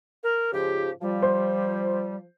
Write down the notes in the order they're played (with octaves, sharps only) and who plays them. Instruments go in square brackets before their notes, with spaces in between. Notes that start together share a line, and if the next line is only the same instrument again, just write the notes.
[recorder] A#4
[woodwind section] G#2 C#3 F3 [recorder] G4
[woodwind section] F3 [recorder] G3
[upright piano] C5